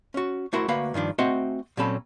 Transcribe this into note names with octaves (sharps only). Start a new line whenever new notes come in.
C#4 F#4
A3 E4 F#4 A#4 C5
D2 A#3 F#4 B4 F5 B5
G2 D#3 F3 D4
A3 C4 F#4 D#5 E5 F#5
A#2 F#3 C4 C#4 A4 B5